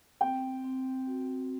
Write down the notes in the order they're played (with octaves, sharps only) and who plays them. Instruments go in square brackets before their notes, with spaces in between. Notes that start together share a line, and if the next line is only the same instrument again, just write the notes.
[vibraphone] C4 [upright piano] G5
[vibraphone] C4
F#4